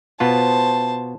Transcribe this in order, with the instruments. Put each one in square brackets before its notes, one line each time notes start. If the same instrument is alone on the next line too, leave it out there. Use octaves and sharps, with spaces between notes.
[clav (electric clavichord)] B2 B3 F4 [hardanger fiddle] C5 A5